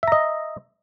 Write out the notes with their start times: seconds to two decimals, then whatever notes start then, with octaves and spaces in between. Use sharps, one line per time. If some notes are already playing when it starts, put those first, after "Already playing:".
0.03 E5
0.08 A#5
0.12 D#5